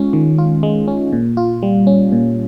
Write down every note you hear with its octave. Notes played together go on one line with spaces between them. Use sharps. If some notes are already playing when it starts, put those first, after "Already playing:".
Already playing: G#3 C#4 F4
D#3
F4
G#3
C#4
A#2
F4
G3
C#4
A#2